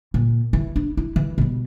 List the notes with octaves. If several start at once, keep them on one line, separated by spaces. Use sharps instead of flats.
A#2
E3
D4
E4
E3
B2 G3